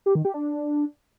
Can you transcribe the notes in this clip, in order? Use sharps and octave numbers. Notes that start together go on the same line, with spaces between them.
G4
D#3
G4
D4